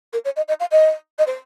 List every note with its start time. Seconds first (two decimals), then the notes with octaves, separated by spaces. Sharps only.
0.13 A#4
0.24 C#5
0.36 D#5
0.48 D#5
0.60 F5
0.71 D#5
1.18 D#5
1.26 C5